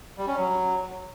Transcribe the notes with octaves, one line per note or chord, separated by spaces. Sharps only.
G3
C#4
F#3